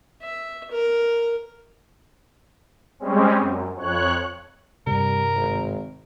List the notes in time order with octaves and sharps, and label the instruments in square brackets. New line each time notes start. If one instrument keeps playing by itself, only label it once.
[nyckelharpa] E5
A#4
[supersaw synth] G3 G#3 C4 C#4
F#2
F2 C#5 F#6
[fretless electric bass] G2 C3 [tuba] G3 [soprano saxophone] A#4
[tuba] G#1